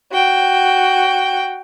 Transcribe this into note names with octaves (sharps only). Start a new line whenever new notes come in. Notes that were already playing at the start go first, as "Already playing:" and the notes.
F#4 G5